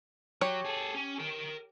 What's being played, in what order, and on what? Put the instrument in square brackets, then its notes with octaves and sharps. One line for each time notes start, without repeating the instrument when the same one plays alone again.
[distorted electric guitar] F#3 [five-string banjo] G4 C#5
[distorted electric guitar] G#4 A4
C#4
A#4 G5